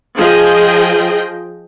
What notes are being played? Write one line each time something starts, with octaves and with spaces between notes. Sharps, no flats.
F3 G#4 D#5 G5